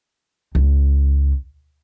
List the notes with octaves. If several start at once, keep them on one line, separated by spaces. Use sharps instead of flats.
C#2